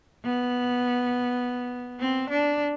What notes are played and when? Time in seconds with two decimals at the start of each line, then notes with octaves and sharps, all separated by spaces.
0.25 B3
2.00 C4
2.30 D4